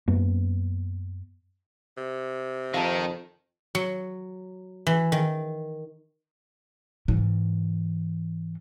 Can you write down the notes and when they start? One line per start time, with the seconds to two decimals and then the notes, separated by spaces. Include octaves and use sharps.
0.08 F#2 A#3 B3
1.97 C3
2.74 F2 D#3 F5 A5 A#5
3.75 F#3
4.87 E3
5.12 D#3
7.08 G#2 E3